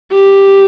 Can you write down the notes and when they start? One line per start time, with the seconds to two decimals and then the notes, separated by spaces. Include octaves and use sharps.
0.12 G4